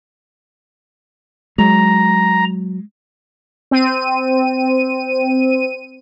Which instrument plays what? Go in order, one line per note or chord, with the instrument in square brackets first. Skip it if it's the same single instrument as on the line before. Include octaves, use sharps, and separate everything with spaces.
[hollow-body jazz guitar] F#3 [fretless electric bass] G#3 [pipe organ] A#5
[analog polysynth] C4 D#7